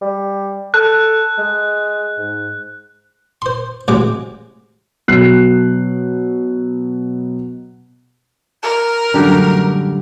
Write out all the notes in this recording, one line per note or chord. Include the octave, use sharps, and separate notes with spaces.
G3
A4 F#6
G#3
G#2
C5 C6
A1 C3 F#3 G#3 D6
B2 F#3 F#6 C7
A#4
F#2 A2 D3 G3 G4